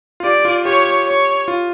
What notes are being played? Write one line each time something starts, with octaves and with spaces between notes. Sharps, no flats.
F4
G4 D5
F4
G4 C#5
C#5
F4